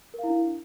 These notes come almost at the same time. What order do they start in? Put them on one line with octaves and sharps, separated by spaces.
A#4 F5 E4 D4